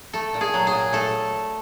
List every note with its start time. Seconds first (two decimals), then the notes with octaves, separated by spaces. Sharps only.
0.13 A3 A4
0.34 A#2
0.41 G#4
0.54 F#3
0.67 G#4
0.73 A#2
0.93 A3 A4